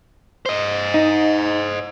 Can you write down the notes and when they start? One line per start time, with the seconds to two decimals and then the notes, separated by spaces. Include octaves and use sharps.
0.46 C5 D#5
0.94 D#4